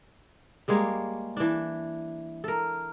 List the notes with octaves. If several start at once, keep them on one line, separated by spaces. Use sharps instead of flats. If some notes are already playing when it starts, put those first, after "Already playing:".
G3 G#3 A#3 C#5
E3 D4
A4 A#4